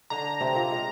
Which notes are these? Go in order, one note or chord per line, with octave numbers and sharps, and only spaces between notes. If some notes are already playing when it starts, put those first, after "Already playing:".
D3 D4 A#5
C3 C4
A#2 A#3
G#3